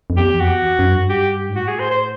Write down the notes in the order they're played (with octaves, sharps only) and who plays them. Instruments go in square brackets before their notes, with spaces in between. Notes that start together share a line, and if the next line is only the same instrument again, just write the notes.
[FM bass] F2
[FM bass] E2 [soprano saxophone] G4
[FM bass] F2
[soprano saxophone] F#4
[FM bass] E2
F#2
G2
[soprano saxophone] G4
[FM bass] G#2
[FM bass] A2 [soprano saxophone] F#4
[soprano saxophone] G#4
C5
C5